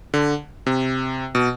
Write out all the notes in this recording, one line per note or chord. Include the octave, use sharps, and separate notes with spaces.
D3
C3
B2